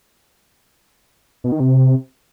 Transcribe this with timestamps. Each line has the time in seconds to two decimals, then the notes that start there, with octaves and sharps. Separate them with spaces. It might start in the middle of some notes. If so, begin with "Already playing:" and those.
1.44 B2
1.52 D#3
1.60 C3